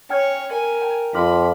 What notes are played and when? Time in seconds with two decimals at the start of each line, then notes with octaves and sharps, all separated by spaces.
0.10 C#4 C#5 G5 F6 G#6
0.52 A#4 G#5
0.82 G5 A5
1.14 F2 F4 B5 D6 F6